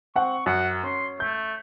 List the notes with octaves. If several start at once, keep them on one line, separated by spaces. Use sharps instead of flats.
C4 F#5 C#6
F#2 F#5
C#4 C6
A3 G6